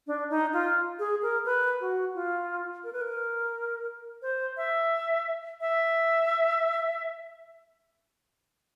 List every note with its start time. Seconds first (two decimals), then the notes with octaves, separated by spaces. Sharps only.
0.07 D4
0.30 D#4
0.53 F4
0.99 G#4
1.22 A#4
1.45 B4
1.80 F#4
2.14 F4
2.84 A#4
2.93 B4
3.01 A#4
4.22 C5
4.57 E5
5.61 E5